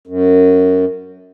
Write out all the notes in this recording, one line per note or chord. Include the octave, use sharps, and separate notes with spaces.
F#2